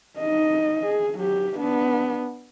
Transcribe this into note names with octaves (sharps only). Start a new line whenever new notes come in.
D#4 D#5
G#4
F#3 G4
B3 D4